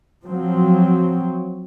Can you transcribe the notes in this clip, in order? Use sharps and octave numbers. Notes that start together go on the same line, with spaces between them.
F3 F#3 C4